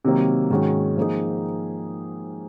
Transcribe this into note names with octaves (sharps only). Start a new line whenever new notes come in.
C3 D#3 F#3 A#3
G#2 D#3 G#3 C#4 F#4
F3 A#3 D#4 G#4